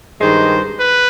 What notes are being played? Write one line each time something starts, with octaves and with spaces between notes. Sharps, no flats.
G2 D#3 G#3 C5
B4